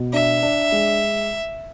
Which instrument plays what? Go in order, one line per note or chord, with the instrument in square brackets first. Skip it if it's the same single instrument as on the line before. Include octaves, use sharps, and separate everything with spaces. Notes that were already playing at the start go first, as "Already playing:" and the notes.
Already playing: [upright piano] B2
[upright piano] D4 [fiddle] E5
[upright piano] D4
G#3